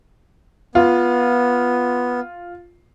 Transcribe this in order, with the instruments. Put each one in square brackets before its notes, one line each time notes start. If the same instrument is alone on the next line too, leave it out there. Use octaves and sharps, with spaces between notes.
[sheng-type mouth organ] B3 [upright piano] F4